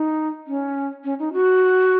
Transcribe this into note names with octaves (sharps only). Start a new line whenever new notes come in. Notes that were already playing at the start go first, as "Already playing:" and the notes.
Already playing: D#4
C#4
C#4
D#4
F#4